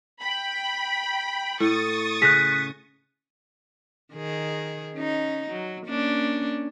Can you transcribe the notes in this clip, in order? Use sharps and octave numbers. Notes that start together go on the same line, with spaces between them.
G5 B5
A2 C#6 D#6 A6
C#3 F#6 A#6 B6
D#3 G#4
C#4 D#4
F#3
A#3 C#4 D4